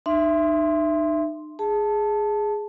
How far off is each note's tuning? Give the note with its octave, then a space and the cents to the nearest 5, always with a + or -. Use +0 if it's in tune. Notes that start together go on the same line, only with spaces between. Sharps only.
D#4 -40 E5 +15 C6 +0
G#4 +0 A5 +0